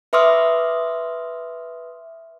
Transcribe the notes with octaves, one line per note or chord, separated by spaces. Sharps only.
B4 E5 C6 D6 D#6 F6